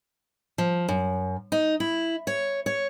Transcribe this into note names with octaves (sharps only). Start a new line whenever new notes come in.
F3
F#2
D#4
E4
C#5
C#5